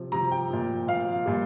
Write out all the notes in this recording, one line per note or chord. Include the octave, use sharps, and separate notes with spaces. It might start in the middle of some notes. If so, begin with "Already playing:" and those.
Already playing: C3 F3
C3 F3 A#5
G5
A#2 F3
A#2 F3 F5
A#2 G3